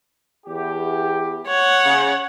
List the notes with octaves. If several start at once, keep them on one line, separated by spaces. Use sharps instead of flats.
E2 G4
C#5 F#5
C#3